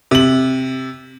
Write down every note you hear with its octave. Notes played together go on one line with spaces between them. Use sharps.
C3 F#7